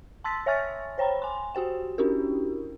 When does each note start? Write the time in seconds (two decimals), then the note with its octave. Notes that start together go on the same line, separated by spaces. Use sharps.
0.24 A5 C6 E6 A6 B6
0.46 C#5 E5 G#5 C#6 F6 A6
0.98 C5 C#5 G5 A#5 B5
1.22 G#5 C6
1.55 F#4 G4 C5 G5
1.98 C#4 D4 E4 F#4 G4 A#4